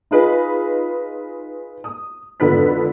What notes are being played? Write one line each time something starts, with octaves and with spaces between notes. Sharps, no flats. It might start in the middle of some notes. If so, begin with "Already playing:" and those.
D#4 F4 G#4 B4 D#5
D#6
G#1 F2 D3 B3 B4 B6